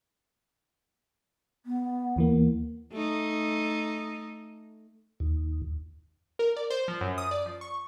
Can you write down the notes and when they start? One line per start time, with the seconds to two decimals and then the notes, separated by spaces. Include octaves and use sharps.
1.66 B3
2.16 D#2 E3 A#3
2.93 A3 D#4
5.20 D#2
6.39 A#4
6.56 D5
6.70 C5
6.88 F3
7.01 F#2
7.18 D#6
7.31 D5
7.46 F3
7.61 C#6